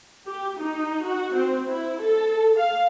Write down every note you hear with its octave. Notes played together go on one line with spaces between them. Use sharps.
G4
D#4
F#4
C4
E4
A4
F5